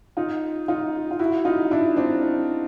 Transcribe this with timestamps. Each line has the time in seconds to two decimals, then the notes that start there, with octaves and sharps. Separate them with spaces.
0.17 D#4 F4
0.68 D#4 F4
1.11 F4
1.19 E4 F#4
1.45 D#4 F4
1.71 D4 E4
1.96 C4 D4